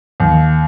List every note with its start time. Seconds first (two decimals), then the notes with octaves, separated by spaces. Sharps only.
0.20 D#2